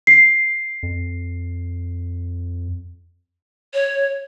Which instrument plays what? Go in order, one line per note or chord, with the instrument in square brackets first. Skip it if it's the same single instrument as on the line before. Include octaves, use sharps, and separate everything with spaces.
[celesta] C7
[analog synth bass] F2
[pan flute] C#5